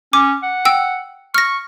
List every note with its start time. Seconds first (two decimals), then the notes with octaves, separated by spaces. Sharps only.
0.13 C#4 D6
0.43 F#5
0.65 G5 E6
1.35 C#6 F6 A#6